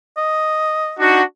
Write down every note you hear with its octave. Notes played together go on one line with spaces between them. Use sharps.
D#5
D4 D#4 F#4